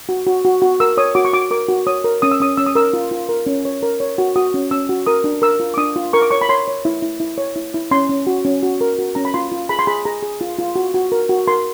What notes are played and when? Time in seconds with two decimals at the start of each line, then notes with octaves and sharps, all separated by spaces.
0.09 F#4
0.27 F#4
0.45 F#4
0.62 F#4
0.80 A#4 E6
0.97 C#5 D#6
1.15 F#4 D6
1.25 C#6
1.33 F#4 D6
1.51 A#4 D6
1.68 F#4
1.87 C#5 D#6
2.04 A#4
2.22 C#4 D#6
2.32 E6
2.40 C#4 D#6
2.57 C#4 E6
2.66 D#6
2.75 A#4 E6
2.93 F4
3.11 F4
3.29 A#4
3.46 C#4
3.65 C#5
3.83 A#4
4.00 C#5
4.18 F#4
4.36 F#4 D#6
4.54 C#4
4.71 C#4 E6
4.89 F#4
5.06 A#4 D#6
5.24 D4
5.42 A#4 E6
5.60 F4
5.74 D6
5.78 D4 D#6
5.96 F4
6.13 A#4 C#6
6.22 D6
6.31 C#5 C#6
6.41 B5
6.49 C#5 C6
6.68 C#5
6.85 E4
7.02 E4
7.20 E4
7.38 C#5
7.56 E4
7.74 E4
7.91 C#4 C6
8.09 C#4
8.27 F#4
8.45 C#4
8.63 F#4
8.81 A#4
8.99 F#4
9.15 C#4 A#5
9.25 B5
9.34 F4 C6
9.52 F4
9.69 G#4 B5
9.79 C6
9.87 G#4 B5
10.05 G#4 A#5
10.23 G#4
10.41 F4
10.59 F4
10.76 F#4
10.94 F#4
11.12 A#4
11.29 F#4
11.48 A#4 C6